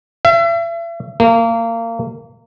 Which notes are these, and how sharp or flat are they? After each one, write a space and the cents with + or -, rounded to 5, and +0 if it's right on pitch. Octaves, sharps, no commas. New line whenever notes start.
E5 +40
A#3 -25